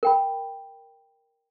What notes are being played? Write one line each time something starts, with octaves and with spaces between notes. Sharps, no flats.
A#4 G5 B5